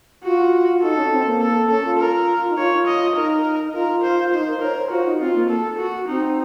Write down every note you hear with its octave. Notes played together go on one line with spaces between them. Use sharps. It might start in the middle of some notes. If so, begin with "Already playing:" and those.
F4 F#4
D#4 A4
C#4
C#4
C4
A#3
A4
C#4 A4
F4
A#4
D#4
F4 C#5
D#5
D#4 A#4
F4 A#4
C5
D#4 C5
A#4
A#4 C#5
C5
F4 F#4
D#4
C4 F4
A#3
A4
F#4
C4 D#4